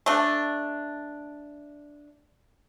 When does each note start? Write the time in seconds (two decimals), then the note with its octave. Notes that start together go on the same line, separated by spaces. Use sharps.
0.06 A3 D4